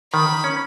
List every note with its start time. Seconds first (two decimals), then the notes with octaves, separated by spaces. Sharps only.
0.14 D#3 B5
0.29 D#3
0.44 C#4